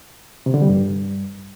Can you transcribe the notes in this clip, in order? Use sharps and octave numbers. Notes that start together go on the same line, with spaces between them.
C3
D3
G3
G2